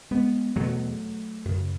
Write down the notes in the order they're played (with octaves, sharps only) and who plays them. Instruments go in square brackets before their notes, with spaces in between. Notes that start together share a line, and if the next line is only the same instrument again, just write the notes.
[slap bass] G#3 B3
E2 B2 F#3 A3
F#2 C#3